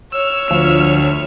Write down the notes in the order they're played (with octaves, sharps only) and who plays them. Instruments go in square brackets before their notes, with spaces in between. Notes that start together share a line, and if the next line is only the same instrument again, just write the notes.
[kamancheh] C#5 F6 [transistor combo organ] E6
[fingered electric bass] D2 [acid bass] F3